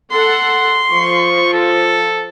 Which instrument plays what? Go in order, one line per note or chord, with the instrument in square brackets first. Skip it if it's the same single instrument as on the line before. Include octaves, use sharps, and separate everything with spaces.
[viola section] A4 F#5 [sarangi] C6
[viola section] F3 [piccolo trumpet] C#6
[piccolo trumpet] A4